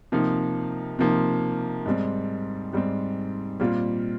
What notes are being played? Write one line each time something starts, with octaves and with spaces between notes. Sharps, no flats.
C3 F3 A#3 D#4
C3 F3 A#3 D#4
G#2 G3 C4
G#2 G3 C4
A#2 G3 C4 F4